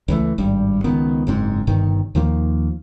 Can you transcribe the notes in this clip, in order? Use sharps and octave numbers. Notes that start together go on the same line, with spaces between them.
C#2 E3 A3
G#1 G2 G3
C#2 D#3 B3
F#1 G#2 C4
G1 G2 C3 D#3
D#2 D#3 F3 A#3